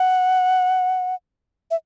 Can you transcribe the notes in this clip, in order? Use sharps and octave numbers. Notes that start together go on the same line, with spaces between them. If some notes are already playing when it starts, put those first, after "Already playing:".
Already playing: F#5
E5